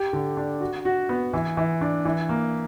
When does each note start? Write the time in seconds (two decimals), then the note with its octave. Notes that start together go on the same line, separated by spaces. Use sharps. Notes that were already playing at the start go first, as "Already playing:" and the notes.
Already playing: G4
0.13 D3
0.37 D4
0.61 F#4
0.85 F#4
1.09 B3
1.33 E3
1.57 E3
1.81 D4
2.05 E3
2.29 A#3